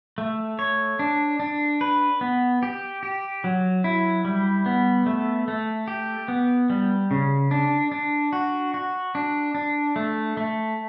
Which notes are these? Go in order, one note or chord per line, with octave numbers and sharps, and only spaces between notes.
A3
C#5
D4
D4
B4
B3
G4
G4
F#3
E4
G3
B3
A3
A3
G4
B3
G3
C#3
D4
D4
F#4
F#4
D4
D4
A3
A3